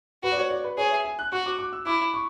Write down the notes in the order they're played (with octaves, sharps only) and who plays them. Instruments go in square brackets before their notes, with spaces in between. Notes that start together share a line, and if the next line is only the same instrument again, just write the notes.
[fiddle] F#4 [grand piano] B4
[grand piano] D5
C#5
D5
B4
[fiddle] G#4 [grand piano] C#5
[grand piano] E5
G#5
F#6
[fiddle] F#4 [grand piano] C#6
[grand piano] D6
D6
E6
[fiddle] E4 [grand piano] D6
[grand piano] C#6